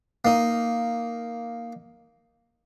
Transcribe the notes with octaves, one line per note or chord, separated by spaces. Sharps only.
A#3 D#4